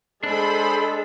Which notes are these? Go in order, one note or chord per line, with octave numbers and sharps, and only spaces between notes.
G#3 D4 A4 C5 B5